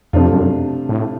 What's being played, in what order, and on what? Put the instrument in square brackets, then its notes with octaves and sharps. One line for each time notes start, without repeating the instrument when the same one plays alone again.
[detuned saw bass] F2 [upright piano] C3 F3 A3 D4 F4
[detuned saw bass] F#2
A2